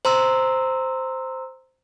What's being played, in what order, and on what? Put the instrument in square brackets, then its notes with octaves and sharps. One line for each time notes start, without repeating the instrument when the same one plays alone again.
[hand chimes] C5 A#5 C6 E6